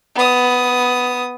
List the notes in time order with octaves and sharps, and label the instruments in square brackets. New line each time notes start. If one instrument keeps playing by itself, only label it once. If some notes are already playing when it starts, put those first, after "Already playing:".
[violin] B3 D#6